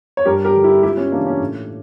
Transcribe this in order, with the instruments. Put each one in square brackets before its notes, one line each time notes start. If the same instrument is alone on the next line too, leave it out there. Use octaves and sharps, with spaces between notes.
[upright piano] C#5
G2 G4 A#4
G4 A#4
D3 G3
E4 G4
C#2 E4 G4
C#4
C#3 E3 A#3 D4
C#4
A2